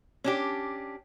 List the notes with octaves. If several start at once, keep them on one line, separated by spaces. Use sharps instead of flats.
C#4 D4 G4